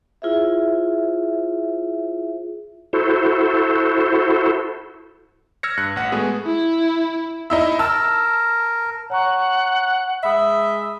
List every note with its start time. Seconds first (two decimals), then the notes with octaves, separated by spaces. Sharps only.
0.22 E4 F4 G#4 C5 E5
2.93 E4 F#4 A4 C5
5.63 E6 F6 G#6 A#6 C#7
5.77 G2 F#6 C#7
5.96 A1 F#5
6.12 G#3 A3 B3 F#4 G#4
6.47 E4
7.50 D#4 E4 E5
7.79 A#4 A5 E6
9.10 C#5 F#5 A#5 C#6
10.24 G#3 E5 B5 D#6